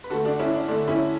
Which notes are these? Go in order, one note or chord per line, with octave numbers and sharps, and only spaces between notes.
B4
D3 A3 F#4 A4
D4 F#4
C#4 E4
D4
D3 A3 D4
C#4 E4